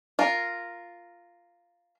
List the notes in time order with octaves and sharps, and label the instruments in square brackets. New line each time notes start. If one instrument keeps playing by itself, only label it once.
[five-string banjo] F4 A#4